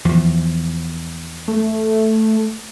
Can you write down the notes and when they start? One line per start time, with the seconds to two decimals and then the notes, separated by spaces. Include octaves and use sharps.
0.05 E2 F3
1.48 A3